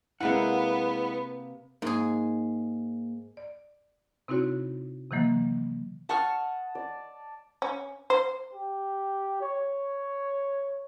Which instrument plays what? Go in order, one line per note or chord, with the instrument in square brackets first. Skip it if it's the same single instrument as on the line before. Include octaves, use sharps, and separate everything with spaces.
[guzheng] C3 A#3 B4 [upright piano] G#3 E4 [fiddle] B3 [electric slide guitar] F#5
[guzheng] G#2 G#4 [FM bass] A#3
[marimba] D5
C3 C4 D#4 E4 F#4 C#5
C3 D#3 E3 F#3 A#3
[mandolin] F#5 C#6 F6 [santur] A5 D#6
[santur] D5
[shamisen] C#4
C5
[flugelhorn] G4
C#5